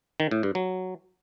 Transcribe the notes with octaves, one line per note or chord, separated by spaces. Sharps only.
D#3
A2
G2
F#3